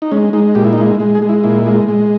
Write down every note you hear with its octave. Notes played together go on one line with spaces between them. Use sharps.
D#4
G#3 C#4
G#3 D#4
A#2 G4
E4
D#4
G#3 E4
G#3
G#4
G#3
E4
A#2 E4
G#3
G#3